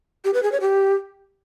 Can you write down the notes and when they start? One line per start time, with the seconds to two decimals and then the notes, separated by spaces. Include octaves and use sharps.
0.25 G4
0.34 B4
0.43 G#4
0.52 C#5
0.61 G4